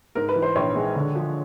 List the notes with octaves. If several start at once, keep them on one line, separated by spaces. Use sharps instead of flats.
G#2 A#4
B4
E3
C5
A#1 C#5
G#3
D3
F3